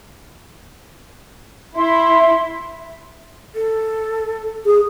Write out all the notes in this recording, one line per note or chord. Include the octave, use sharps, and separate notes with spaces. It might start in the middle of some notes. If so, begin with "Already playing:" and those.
E4 E5 C6
A4
G#4